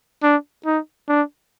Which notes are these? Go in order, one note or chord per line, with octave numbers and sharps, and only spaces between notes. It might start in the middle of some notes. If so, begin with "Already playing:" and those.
D4
D#4
D4